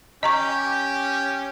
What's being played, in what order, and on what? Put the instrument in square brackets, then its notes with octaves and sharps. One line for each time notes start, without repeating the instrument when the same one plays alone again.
[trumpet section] C#4 G4 [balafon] D#5 A#5 C#6